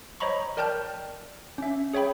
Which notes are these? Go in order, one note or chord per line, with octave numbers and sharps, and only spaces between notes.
C5 C#5 D#5 A#5 B5 C#6
A#4 D5 G5 A5 F6 G6
C#4 E5
G#4 C#5 E5 G5 B5